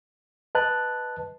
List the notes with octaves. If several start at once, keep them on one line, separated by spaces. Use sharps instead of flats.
B4 D#5 A5 F#6